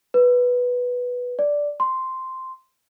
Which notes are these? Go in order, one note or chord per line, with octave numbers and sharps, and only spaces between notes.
B4
D5
C6